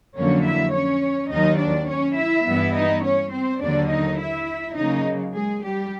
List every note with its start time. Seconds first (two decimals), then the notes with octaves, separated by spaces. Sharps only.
0.15 F2 D3 F#3 A#3 C#4 C#5
0.44 E4 E5
0.73 C#4 C#5
1.31 D#2 D#3 F#3 D#4 D#5
1.59 D4 D5
1.88 C#4 C#5
2.17 E4 E5
2.46 G2 E3 G3 B3 E4
2.75 D#4 D#5
3.04 C#4 C#5
3.32 C4 C5
3.61 D#2 D3 F#3 A#3 D4 D5
3.89 D#4 D#5
4.18 E4 E5
4.76 C#3 F#3 A#3 D#4 D#5
5.33 G#3 G#4
5.62 G3 G4